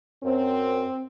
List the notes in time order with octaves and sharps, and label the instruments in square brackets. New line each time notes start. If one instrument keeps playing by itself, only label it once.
[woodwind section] F#2 [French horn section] C4